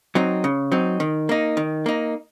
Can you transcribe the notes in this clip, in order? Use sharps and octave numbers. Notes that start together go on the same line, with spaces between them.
F#3 C4 D#4
C#3
F#3 C4 D#4
D#3
A#3 D#4
D#3
A#3 D#4